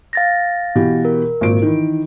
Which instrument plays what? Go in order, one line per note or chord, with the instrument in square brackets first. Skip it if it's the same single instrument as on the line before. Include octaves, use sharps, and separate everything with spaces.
[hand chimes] F5 A6 A#6
[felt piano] B2 E3 G4
[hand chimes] A#4
[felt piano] G#1 A#2 D7
D#3 E3